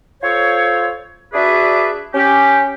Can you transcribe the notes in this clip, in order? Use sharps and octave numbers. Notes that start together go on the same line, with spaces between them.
F4 A4 C5 C#5
D4 F#4 G#4 B4 D5 E5
C#4 G4